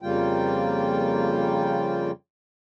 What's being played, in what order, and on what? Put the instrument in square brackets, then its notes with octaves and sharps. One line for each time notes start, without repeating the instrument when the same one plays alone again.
[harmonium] F2 C#3 G3 A#3 F4 G5